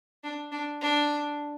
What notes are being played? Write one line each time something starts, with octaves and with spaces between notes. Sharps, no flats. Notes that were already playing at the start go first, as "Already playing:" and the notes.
D4
D4
D4